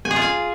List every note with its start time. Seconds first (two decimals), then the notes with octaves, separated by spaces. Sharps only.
0.05 G#5
0.11 G#4
0.16 F4
0.22 G#5